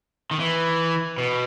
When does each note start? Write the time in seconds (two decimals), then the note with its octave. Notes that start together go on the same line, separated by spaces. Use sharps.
0.31 D#3
0.39 E3
1.18 B2